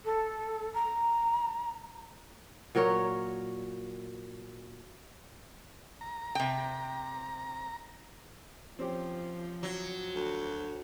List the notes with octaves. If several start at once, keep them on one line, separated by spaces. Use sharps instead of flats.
A4
A#5
A#2 F#3 A#4 C#5
A#5
C3 G5
F3 C4 C#4 G4
F#3
D2